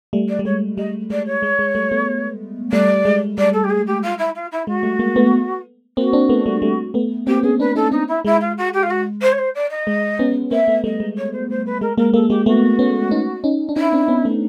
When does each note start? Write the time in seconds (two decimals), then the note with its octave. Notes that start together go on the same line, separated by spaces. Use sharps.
0.13 G3 A3
0.28 D5
0.39 G3
0.45 G#3 C#5
0.77 G3 D#5
1.10 G#3 D5
1.26 C#5
1.43 G#3
1.59 G#3
1.75 G3 A3
1.91 A3 B3
2.72 G3 A3 D5
3.05 G#3
3.37 G3 D5
3.53 A4
3.64 G4
3.70 G#4
3.87 G4
4.02 F4
4.18 E4
4.35 F4
4.51 E4
4.67 G#3 F#4
4.83 G3 A3
4.99 G#3 A#3
5.16 A3 B3
5.97 A#3 C4 F#4
6.13 C4 D4
6.29 A3 B3
6.46 G3 A3
6.62 G3 A3
6.94 A3 B3
7.27 A#3 C4 G4
7.43 B3 C#4 G#4
7.59 C4 D4 B4
7.75 C#4 D#4 A4
7.92 C4 D4 D#4
8.08 E4
8.25 G#3 E4
8.40 F4
8.57 F#4
8.73 G4
8.83 F4
8.90 F#4
9.21 C5
9.32 C#5
9.38 C5
9.54 D5
9.70 D#5
9.87 G#3
10.19 B3 C#4
10.51 A#3 C4 E5
10.68 A3 B3
10.84 G3 A3 D#5
11.00 G#3
11.17 C#5
11.32 C5
11.50 C5
11.66 B4
11.81 G#3 A#4
11.98 G#3 A#3 A#4
12.14 G#3 A#3 A4
12.30 G#3 A#3 G4
12.46 A3 B3 F#4
12.79 B3 C#4
13.11 C#4 D#4
13.44 C#4 D#4
13.69 D4
13.76 C#4 D#4 E4
13.93 C4 D4
14.08 B3 C#4
14.25 A3 B3